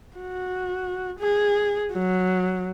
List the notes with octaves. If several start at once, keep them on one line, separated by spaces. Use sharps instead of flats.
F#4
G#4
F#3